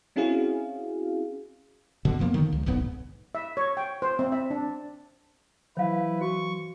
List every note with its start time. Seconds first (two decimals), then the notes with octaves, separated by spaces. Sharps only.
0.16 C4 C#4 E4 F#4 G#4 F5
2.05 F#1 B2 D3
2.19 F#1 F3 A#3 B3
2.34 D3 D#3
2.52 C#2
2.66 D#1 B1 G#2 B3
3.35 E5
3.57 C#5
3.77 G5
4.02 C5
4.19 C4
4.32 E5
4.50 D4
5.77 E3 F#3 E4 B4 C5 F5
6.21 F#4 C#6